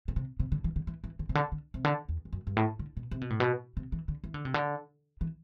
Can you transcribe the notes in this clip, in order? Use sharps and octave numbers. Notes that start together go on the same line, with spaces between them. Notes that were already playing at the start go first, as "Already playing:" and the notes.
B2
C3
C3
D3
E3
D3
E3
E3
D3
C3
D3
D3
C3
D3
E2
E2
F#2
G2
A2
D3
B2
C3
B2
A2
B2
C3
E3
D3
E3
D3
C3
D3
E3